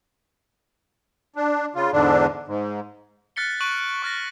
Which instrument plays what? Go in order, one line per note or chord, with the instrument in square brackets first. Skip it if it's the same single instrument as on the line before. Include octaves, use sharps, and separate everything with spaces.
[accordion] D4
C#3 F4
E2 G#2 D3 D4
G#2
[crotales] F6 F#6 A6 B6 C#7 G7
C#6 F#6 A6 D7 D#7 F#7
C#6 F6 A6 A#6